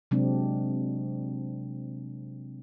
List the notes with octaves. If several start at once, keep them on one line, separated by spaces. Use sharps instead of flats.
C3 F#3 G#3 C4 D4